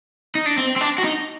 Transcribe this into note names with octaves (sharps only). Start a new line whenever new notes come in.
D#4
D4
C4
C4
D4
F#4
D#4